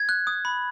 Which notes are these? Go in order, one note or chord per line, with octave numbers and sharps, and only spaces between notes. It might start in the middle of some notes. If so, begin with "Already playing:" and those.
Already playing: G#6
F#6
D#6
B5